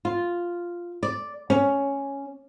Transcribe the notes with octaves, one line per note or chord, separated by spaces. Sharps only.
F4
D5
C#4